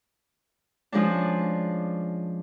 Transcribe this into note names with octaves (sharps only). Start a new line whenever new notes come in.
F3 G#3 C#4 D4